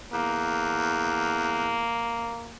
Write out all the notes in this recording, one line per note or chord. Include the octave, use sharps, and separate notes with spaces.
E2 A#3